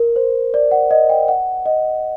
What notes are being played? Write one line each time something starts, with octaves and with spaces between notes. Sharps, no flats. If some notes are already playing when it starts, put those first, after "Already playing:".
Already playing: A#4
C5
D5
F#5
D#5
G5
F#5
D#5